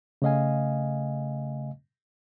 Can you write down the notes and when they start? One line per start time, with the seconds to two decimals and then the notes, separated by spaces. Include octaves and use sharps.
0.22 C#3 A3 D#5 F5 G#5